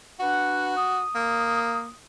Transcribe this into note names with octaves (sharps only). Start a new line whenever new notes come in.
D4 F#4 B4 F#5
D#6
A#3